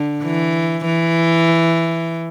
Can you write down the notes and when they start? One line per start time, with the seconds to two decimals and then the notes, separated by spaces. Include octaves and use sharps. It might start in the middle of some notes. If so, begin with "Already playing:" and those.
Already playing: D3
0.24 E3
0.85 E3